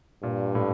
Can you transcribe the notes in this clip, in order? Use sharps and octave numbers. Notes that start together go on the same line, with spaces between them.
G2 A#2
A2